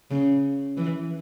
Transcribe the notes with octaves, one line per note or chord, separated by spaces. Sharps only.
C#3
E3